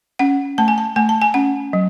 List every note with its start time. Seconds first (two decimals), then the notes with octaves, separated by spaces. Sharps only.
0.19 C#4 F#5
0.58 A3 A5
0.68 G#5
0.78 A5
0.96 A3 G#5
1.09 A5
1.22 G#5
1.34 C#4 F#5
1.73 F#3